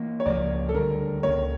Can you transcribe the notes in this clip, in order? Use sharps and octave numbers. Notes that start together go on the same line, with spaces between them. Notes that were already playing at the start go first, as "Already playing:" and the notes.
Already playing: E3 A#3
C#5
C#2 C#3 F3 A#3 D5
A4
D2 D3 G3 D4 A#4
C#2 C#3 E3 A#3 C#5